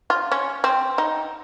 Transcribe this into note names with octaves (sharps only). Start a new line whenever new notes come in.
F4
C#4
C4
D#4